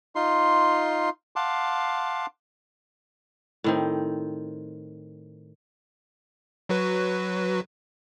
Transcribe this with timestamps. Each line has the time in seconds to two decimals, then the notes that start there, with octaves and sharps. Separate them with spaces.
0.16 D#4 F4 C6
1.36 F5 F#5 A5 C6 D6
3.64 A2 D#3 C4
6.69 F#3 F#4 B4